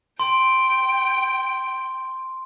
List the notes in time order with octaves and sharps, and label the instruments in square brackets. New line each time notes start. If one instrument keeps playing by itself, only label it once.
[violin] G5 [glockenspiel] C6